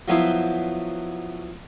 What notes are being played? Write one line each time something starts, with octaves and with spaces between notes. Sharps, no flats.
F3 F#3 B3 E4 C5